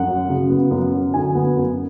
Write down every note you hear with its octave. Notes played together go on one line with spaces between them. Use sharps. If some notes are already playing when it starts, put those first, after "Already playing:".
Already playing: F#2 F#5
F#3
C#3
B3
F#2
F#3
D3 G#5
B3
F#2